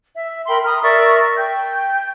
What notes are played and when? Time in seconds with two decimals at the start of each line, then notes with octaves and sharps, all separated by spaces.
0.16 E5
0.48 A#4 G5 B5 C6
0.64 A#5 D#6 F6
0.83 A#4 D5 E5 C#6
1.36 G5 G6